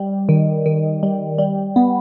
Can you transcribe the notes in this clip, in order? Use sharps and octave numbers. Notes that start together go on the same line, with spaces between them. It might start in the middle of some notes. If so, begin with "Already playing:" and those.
Already playing: G3
D#3
D#3
G3
G3
B3